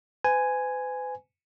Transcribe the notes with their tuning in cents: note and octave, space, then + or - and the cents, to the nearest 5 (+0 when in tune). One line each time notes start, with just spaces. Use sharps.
B4 +45 G#5 +0